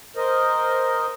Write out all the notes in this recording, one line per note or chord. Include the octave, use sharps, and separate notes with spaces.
A#4 C5 D#5